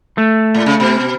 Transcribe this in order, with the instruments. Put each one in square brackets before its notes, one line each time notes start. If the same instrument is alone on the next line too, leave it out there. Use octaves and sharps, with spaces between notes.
[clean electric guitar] A3
[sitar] A2
C#3
B2